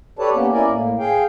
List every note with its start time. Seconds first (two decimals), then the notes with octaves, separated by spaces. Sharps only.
0.19 G4 A4 B4 C#5 D5 A5
0.35 A#3 B3 C#4 G4
0.53 C#4 E4 A#4 D5 G#5
0.67 A2 A#3
0.99 G#4 F5 G5